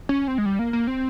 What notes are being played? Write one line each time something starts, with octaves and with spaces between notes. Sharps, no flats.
C#4
C4
G#3
G3
A#3
A#3
C4